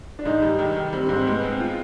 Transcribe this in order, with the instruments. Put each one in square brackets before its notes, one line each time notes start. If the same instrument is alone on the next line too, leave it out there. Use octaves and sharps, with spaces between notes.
[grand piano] D4
[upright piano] G#2 [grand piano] D#4
[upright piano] G3
D#3
D#3
[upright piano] G3 [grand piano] C4
[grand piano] D4
[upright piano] G#2 [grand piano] C4
[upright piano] G#3 [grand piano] B3
[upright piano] C4
F4